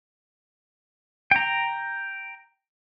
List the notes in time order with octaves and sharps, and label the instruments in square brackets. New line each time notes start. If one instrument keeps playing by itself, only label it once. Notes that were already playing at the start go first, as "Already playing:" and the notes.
[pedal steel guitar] G5 A#5